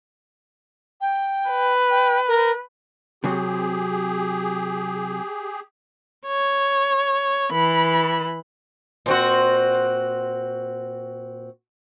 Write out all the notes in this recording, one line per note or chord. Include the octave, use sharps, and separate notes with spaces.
G5
B4
G5
A#4
C3 F#3 C4 G4 G#4
C#5
E3 B5
A#2 C4 F#4